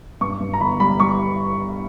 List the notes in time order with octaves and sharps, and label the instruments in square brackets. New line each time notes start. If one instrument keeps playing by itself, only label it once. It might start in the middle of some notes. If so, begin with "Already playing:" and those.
[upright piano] G2 C#6
G2
A#5
G1 B5
G3 B5
G3 C#6